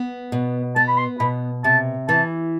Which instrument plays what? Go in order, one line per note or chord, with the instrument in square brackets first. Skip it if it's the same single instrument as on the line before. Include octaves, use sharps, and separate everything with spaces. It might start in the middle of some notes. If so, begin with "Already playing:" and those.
Already playing: [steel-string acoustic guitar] B3
B2
[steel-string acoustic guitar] B3 [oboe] A5
[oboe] B5
C6
[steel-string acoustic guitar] B2 [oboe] B5
[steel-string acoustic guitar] C3 [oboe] A5
[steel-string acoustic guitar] E3 [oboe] A5